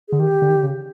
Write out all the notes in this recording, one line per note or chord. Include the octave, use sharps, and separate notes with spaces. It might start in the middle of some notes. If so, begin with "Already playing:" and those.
D3 G#4
D#3 G4
D3
D#3
D3
C#3